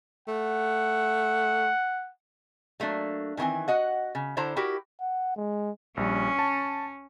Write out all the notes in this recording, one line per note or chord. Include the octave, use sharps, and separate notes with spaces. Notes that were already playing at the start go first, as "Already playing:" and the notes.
A3 F#5
F#3 A3 A#3 D4
A#2 D#3 E3 C4 G#5
F#4 D#5 F#5
C#3
D3 E4 C5 A5 A#5
E4 F#4 G4 A#4
F#5
G#3
A#1 G3 C#4
A5